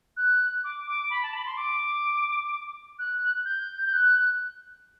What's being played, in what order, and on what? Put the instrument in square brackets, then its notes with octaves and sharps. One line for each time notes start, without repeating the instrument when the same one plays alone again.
[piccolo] F#6
D6
D6
B5
A5
B5
C6
D6
F#6
G6
G6
F#6